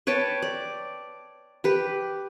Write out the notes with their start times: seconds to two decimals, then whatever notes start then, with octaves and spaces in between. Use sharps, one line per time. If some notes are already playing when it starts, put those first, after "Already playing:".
0.07 B4 C#5 G5 A5
0.42 D5
1.64 G4 B4